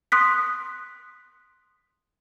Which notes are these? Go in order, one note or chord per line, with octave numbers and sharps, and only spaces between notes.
C6 D#6 F#6 B6